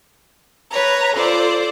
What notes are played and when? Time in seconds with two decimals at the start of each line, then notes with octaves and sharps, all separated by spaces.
0.71 B4 C#5 A#5
1.13 F4 A4 C5 D5